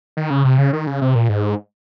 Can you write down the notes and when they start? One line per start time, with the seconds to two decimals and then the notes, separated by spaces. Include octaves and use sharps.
0.17 D#3
0.30 C#3
0.45 C3
0.58 C#3
0.73 D#3
0.87 C#3
1.02 C3
1.15 A#2
1.29 G#2